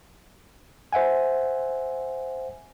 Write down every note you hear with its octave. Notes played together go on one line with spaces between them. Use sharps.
C5 E5 F#5 G#5